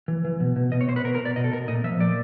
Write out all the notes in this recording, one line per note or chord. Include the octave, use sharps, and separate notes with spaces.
E3
E3
B2
B2
B2 D#5
C#5
B2 C5
B4
B2 A#4
A#4
B2 D5
B2 D#5
A4
B2 A#4
A#2 D#5
F3 E5
A#2 D5